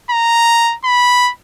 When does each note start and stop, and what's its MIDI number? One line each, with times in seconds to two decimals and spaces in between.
0.11 0.75 82
0.85 1.31 83